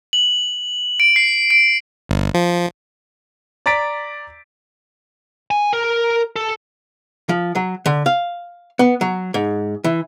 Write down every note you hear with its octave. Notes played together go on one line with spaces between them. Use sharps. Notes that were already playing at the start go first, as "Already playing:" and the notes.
F#7
D7
C7
D7
G1
F3
D5 A#5 A6 B6 D7
G#5
A#4
A4
F3
F#3
D3
F5
B3
F#3
G#2
E3